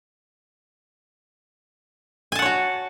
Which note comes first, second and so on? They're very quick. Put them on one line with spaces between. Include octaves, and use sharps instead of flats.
G#5 A5 F#5 C#5 F#4